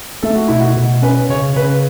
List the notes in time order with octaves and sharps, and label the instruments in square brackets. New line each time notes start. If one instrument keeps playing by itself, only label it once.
[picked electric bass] A3 [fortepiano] A4
[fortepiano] F#4
[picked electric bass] B2 [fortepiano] E4
[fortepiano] F#4
[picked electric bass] B2
[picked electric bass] C#4 [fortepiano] B4
[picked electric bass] C#3 [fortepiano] C#5
[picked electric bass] C#3 [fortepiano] B4